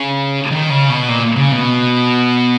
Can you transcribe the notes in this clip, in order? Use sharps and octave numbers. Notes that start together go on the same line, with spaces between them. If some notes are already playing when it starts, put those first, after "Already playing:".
Already playing: C#3
D#3
C#3
B2
A#2
C#3
B2